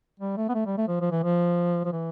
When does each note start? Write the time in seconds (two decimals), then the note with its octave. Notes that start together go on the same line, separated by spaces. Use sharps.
0.19 G3
0.37 A3
0.49 B3
0.54 A3
0.66 G3
0.77 A3
0.88 F3
1.01 F3
1.11 E3
1.23 F3
1.85 F3
1.92 E3